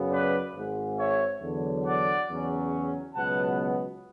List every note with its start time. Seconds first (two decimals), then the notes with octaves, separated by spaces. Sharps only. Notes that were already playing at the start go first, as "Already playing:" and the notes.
Already playing: F#2 C#3 F#3 B3
0.11 B4 D5
0.54 G#1 G#2 G#3
0.98 C#5 E5
1.41 E2 D3 F#3
1.85 D5 F#5
2.28 E2 C#3 F#3 C#4
3.15 C#2 B2 F#3 B3 F#5 A5